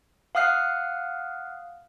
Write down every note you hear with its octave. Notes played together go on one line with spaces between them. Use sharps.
F5 F#5 D#6 F6 F#6 C7